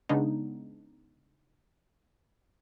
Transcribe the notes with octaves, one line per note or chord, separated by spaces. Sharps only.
C#3 G#3 B3 D4 D#4